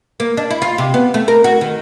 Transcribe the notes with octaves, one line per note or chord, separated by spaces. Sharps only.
A#3
D4
E4
F4
C3
B3
A3
A#4
F#4
D#3